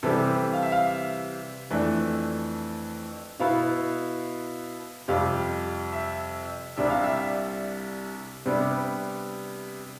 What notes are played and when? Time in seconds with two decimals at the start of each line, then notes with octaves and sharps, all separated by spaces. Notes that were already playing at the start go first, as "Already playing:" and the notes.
0.03 C3 E3 G3 C4 A4
0.53 F5
0.63 E5
0.72 F5
0.87 E5
1.70 F2 E3 A3 D4
3.39 B2 B3 E4 F5
5.08 F2 C3 G3 F5
5.92 E5
6.77 C2 C3 G3 D4 E5
6.90 F5
7.04 E5
8.46 C3 G3 B3 D4